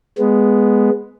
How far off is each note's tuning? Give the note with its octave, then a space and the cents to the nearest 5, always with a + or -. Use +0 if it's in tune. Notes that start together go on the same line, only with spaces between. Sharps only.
G#3 +0 B3 +0